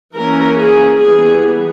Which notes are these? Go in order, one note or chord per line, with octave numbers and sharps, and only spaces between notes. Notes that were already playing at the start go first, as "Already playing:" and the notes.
E3 A#3 C#4 A#4
G#4
E3 G3 B3 G#4